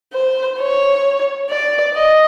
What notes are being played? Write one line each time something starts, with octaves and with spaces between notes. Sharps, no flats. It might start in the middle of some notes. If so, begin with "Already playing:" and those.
C5
C#5
D5
D#5